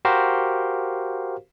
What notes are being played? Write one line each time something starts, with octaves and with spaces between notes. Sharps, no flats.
F#4 G4 A#4 C5 F5